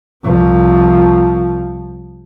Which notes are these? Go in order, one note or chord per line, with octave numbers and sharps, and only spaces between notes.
C2 F3